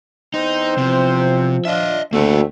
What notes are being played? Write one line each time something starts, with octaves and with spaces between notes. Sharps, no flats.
E2 C4 D#4 C5
C3 F3
D4 F4 D#5 E5
D2 A3 A#3 C4 F#4